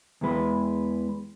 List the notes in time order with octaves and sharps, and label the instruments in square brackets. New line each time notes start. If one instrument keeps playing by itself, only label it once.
[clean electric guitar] E2 E3 G#3 B4